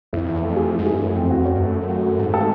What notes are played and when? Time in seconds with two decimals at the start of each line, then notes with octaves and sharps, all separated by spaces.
0.13 F2 E4
0.27 E2 E4
0.42 F2 A3
0.56 G#4
0.71 E4
0.79 G#2
0.86 G2 G#4
1.01 F#2 A3
1.16 F2 C4
1.30 E2 F#4
1.45 F2 C#4
1.56 G2
1.60 F#2 A3
1.74 A3
1.89 F#4
2.04 A3
2.19 G#2 A3
2.34 A4